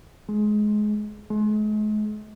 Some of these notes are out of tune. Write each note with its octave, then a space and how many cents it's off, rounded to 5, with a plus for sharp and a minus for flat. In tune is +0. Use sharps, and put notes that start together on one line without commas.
G#3 +20
G#3 +40